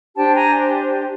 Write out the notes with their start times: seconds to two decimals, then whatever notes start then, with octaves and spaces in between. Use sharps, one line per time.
0.16 D4 G4 C5 G5 A5
0.35 G#5 A#5